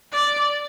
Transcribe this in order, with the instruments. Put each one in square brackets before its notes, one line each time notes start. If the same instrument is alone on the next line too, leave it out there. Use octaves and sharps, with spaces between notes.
[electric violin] D5